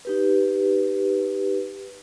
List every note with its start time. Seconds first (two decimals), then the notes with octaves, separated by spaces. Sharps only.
0.05 D#4 G4 B4